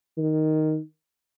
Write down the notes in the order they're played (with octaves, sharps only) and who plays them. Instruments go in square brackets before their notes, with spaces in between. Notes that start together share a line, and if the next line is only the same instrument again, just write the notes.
[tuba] D#3